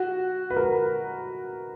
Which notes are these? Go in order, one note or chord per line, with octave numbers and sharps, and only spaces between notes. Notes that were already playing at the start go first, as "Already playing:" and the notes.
Already playing: F#4
B4
A#4